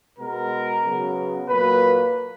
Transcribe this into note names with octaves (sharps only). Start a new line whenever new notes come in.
B2 G#3 B3 A#4
C#3 F#3 B3
A#2 F#3 A#3 B4